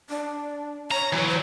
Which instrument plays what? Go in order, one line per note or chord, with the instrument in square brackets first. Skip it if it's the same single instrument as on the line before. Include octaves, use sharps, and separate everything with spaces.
[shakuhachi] D4
[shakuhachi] C#5 [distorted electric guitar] A#5
[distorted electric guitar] E3 F#3
[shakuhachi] C5